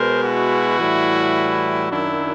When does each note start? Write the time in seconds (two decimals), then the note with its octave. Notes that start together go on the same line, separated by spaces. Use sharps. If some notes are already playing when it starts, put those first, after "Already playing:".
Already playing: B2 G#3 A#4 C5
0.24 E4 F#4
0.80 A2 E3 G3
1.89 F#2 D#3 F#3 D4 E4